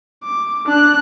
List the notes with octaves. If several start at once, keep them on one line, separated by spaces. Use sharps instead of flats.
D6
D4 F#6